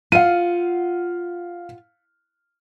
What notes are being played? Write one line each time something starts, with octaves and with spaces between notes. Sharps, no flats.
F4 F5 F#5 D#7